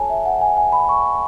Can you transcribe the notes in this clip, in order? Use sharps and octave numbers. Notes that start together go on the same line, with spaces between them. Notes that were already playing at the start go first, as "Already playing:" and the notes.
Already playing: F#4 A4 C#5 G#5 A5
E5
F#5
G#5
G#5
B5
C#6